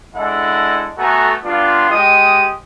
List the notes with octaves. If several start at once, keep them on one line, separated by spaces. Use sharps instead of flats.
G#3 D4 E4 A4 D#5 F#5
A3 B3 F#4 A4 G#5 A#5
G3 B3 D4 F4
G#3 G4 D#5 D#6